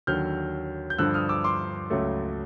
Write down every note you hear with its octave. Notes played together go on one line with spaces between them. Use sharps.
D#2 D3 F#3 F6 G6
G6
G2 D3 F3 E6 F#6
D#6 F6
D6 E6
C6 D6
C#2 C#3 F#3 A3